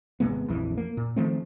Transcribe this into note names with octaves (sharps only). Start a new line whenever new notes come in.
G#1 C3 G#3 B3
A#1 F2 E3
A#3
A#2
D#3 F3 A3 C4